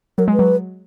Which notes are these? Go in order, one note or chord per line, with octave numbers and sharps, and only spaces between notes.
F#3 A#4
G#3
B4
F#3